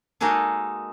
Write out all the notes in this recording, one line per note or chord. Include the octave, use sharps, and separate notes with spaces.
G#3 A#3 D#4 F#4 G#4 A4